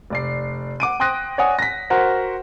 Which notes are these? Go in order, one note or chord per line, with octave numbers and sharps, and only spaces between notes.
F1 D5 C7
F#5 D6 D7 D#7
G5 C6 D#6 F#6 A#6 D#7
C#5 D5 F#5 G#5 D#6
A#6 B6
F#4 A#4 C5 F#5